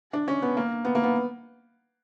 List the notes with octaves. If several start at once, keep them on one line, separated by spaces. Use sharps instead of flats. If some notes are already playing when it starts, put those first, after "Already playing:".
D4
C#4
B3
A#3
B3
A#3
B3